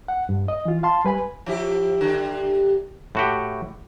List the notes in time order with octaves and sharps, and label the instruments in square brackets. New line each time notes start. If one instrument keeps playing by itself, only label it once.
[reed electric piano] F#5
G2
D#5
E3 F4
F5 A5 C6
G3 B4 G#5 B5
[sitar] F3 E4 G4
D3 G3
[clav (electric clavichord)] A2 F#4 G4